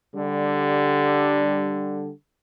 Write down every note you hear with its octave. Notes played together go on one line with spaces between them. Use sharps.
D3 G3